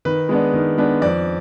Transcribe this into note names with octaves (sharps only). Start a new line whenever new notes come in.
D#3 B4
G#3 B3 D4
D#3
G#3 B3 D4
F2 D5